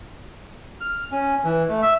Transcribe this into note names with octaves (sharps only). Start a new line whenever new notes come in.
F6
C#4
E3
A3
E5